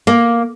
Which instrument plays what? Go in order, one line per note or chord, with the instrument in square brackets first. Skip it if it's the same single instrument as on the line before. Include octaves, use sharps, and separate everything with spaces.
[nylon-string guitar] A#3